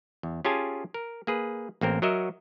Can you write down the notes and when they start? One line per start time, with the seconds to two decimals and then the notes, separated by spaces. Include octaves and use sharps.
0.23 E2
0.45 C#4 F4 G4 G#4 G#5 A5
0.94 A#4
1.27 A#3 G#4 B4
1.81 A1 A#3 C4 A#4
2.02 F#3 F#4 A#4 C#5 D#5 E5